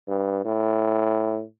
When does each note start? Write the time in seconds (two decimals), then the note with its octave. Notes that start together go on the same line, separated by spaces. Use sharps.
0.08 G2
0.45 A2